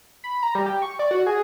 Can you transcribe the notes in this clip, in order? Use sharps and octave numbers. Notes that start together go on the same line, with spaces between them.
B5
A#5
G3
G4
C#6
D5
F#4
G#4